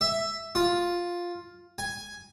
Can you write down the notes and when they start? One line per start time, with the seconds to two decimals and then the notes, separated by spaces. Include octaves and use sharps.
0.01 E5
0.55 F4
1.78 G#5